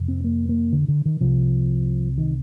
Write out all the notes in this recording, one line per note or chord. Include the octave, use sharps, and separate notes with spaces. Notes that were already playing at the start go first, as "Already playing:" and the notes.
Already playing: F2 C3
C4
A#3
A#3
D3
D3
D#3
C2 C3 F3
D#3